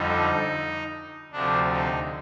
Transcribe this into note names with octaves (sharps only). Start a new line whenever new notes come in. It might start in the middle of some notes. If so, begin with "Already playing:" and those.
Already playing: F2 D3 G3 D#4
D2 C3 F3 D4
D#4